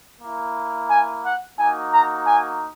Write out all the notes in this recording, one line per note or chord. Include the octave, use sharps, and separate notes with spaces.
A#3 E4
G#5
F#5
A#3 D#4 F#4 G#5
A#5
G#5